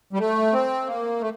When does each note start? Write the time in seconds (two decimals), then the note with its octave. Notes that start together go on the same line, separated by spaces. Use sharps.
0.13 G3
0.19 A3
0.53 C4
0.87 A#3
1.21 A3